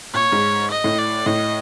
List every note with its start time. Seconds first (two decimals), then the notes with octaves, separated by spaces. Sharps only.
0.14 A#2 C#5
0.32 G#2
0.70 D#5
0.84 A2
0.98 D5
1.26 A2 D#5